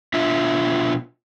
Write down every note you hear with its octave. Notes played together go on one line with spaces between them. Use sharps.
B2 D4 F4 E5